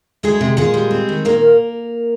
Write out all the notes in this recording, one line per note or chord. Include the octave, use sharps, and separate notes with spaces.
D2 G#3 G#4
C3
A#2 G#3 G#4
G3
C4
D#3
A#2 A#3 A#4